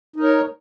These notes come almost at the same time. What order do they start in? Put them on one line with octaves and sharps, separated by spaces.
D#4 A#4 C#5